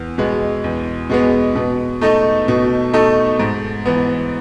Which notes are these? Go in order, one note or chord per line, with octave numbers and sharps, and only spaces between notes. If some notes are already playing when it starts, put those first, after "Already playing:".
Already playing: E2
B2 G#3 B3
E2
B2 G#3 B3
B2
A3 D#4 A4 D#5
B2
A3 D#4 A4 D#5
G#2
E3 B3